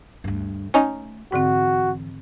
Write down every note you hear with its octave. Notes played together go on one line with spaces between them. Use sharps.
D2 G2
A3 C#4 D#4
G#2 D3 E3 C4 F#4